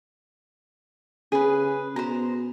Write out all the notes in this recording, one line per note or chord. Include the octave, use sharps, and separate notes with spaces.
C#3 G#4 B4
B2 C5 A#5